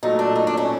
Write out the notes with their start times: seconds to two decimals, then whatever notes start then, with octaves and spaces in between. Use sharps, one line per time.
0.03 A#2 F#3 A3 D#4
0.19 D4
0.36 D#4
0.47 D4
0.57 C#4